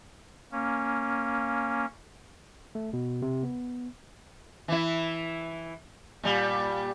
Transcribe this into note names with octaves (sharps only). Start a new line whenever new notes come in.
A#3 C#4
A3
B2
C3
B3
E3 E4
A#2 G3